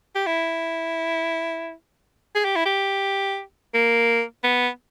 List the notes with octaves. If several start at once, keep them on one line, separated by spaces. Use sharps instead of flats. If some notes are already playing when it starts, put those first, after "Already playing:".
G4
E4
G#4
G4
E4
G4
A#3
B3